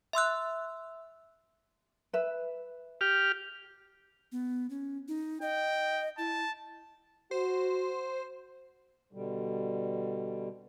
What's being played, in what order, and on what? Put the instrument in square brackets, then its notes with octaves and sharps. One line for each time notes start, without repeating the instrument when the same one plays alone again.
[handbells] E5 C6 E6 F#6
[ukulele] B4 E5
[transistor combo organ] G4 F6
[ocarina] B3
C#4
D#4
[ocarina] D#5 [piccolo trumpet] G5
[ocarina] E4 [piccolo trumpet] A5
[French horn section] F#4 [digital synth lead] C5
[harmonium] B2 D3 G3